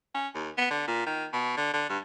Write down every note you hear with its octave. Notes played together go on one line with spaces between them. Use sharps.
C#4
D#2
B3
D3
A#2
D#3
B2
D3
D3
G2